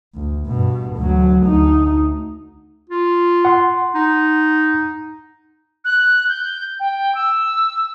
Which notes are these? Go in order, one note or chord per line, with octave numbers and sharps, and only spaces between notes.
D2
G2 B2
D2 F#3
D2 D#4
F4
F#5 C6
D#4
F#6
G6
G5
E6